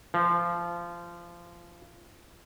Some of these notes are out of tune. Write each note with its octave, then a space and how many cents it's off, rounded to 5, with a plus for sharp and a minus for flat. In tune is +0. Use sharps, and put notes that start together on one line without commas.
F3 -20